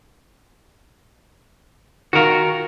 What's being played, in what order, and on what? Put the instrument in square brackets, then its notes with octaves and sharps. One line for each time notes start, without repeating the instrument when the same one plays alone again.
[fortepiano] D#3 F4 [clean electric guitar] F#4 A#4